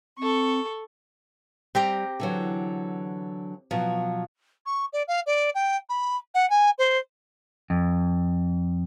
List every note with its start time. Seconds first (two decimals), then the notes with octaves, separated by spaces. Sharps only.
0.19 C4 A4 C#6
1.75 G3 C4 G4 A#5
2.20 D3 E3 F#3
3.71 B2 F3 F#3
4.66 C#6
4.93 D5
5.08 F5
5.26 D5
5.55 G5
5.89 B5
6.34 F#5
6.50 G#5
6.78 C5
7.70 F2